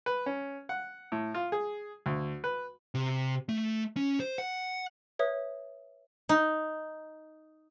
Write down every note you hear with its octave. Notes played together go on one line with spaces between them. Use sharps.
B4
C#4
F#5
A2
F4
G#4
D2
B4
C3
A3
C#4
C5
F#5
B4 C#5 E5 D#6
D#4